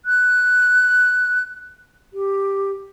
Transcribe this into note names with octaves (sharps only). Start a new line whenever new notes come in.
F#6
G4